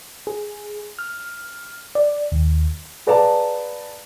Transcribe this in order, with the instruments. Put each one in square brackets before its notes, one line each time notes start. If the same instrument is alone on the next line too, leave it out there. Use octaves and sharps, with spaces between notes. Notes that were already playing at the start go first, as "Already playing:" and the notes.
[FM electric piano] G#4
F6
D5
D#2
[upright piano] G#4 B4 D5 F5 A5 A#5